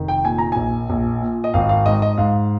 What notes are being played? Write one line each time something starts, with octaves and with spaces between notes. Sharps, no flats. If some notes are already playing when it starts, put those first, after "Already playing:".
Already playing: F1 D#3
G5
A#2 G#5
A#5
A#1 G#5
A#1
A#2
D#5
G#1 F5
F5
G#2 D#5
D#5
G#2 F5